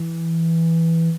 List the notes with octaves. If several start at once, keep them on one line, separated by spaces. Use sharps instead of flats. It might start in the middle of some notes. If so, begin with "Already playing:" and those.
Already playing: E3